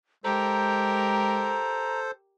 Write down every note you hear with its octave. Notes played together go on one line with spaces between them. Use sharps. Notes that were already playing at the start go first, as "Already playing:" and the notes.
G#3 G4 A4 A#4 C5 A#5